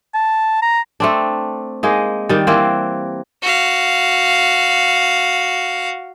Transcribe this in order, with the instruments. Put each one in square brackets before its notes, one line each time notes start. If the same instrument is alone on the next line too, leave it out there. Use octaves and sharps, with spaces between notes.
[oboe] A5
A#5
[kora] A3 C4 D4
G#3 A#3 D#4
D#3 G3
E3 A#3 C4
[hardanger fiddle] F#4 F5